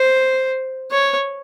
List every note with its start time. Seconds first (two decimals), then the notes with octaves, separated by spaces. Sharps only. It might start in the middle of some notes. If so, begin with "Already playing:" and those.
Already playing: C5
0.91 C#5